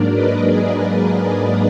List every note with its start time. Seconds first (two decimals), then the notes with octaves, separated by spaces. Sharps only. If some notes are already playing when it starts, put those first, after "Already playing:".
Already playing: G#2 F#3 A#3 D4 A#4 D5
0.13 B4 D#5
0.42 G#4 B4